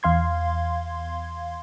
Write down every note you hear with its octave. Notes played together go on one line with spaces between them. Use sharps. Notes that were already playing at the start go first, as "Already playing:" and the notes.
E2 F5 C6 G#6